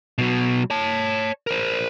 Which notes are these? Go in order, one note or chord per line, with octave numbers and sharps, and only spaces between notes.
B2 F#3
C#5 A5
A#4 C5